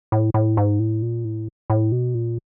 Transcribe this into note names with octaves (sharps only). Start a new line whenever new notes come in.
A2
A2
G#2
A2
A#2
A2
A2
B2
A#2